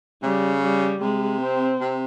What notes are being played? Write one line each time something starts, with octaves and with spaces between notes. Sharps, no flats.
C#3 G3
G3
C3 G#3
C4
C3